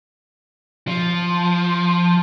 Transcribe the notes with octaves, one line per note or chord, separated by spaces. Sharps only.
F3